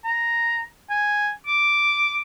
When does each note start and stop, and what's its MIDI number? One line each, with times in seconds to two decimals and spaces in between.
0.05 0.64 82
0.90 1.30 80
1.47 2.21 86